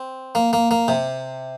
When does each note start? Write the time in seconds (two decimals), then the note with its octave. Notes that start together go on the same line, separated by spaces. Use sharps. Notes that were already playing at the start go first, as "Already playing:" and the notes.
Already playing: C4
0.35 A#3
0.53 A#3
0.71 A#3
0.88 C3